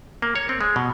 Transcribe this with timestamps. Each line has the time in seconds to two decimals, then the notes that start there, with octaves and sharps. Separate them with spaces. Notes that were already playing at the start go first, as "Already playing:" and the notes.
0.22 A#3
0.36 C#5
0.49 C4
0.61 G#3
0.76 B2